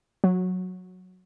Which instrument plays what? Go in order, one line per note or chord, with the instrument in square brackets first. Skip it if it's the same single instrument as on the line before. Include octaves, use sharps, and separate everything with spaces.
[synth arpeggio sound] F#3